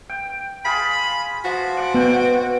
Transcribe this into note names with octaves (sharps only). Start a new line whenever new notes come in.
G5
F4 G#4 B5
F3 F#4
D5 F#5
B2 B3 G5